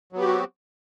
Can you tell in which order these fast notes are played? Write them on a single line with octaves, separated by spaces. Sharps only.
F#3 B3 G4 F#4 C4